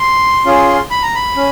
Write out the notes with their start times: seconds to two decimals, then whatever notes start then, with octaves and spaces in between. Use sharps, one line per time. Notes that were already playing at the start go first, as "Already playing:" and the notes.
Already playing: C6
0.45 C#4 F4 G#4
0.90 B5
1.02 A#5
1.15 B5
1.36 C#4